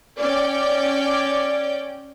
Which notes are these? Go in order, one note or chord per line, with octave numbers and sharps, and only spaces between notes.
C#4 D5 G5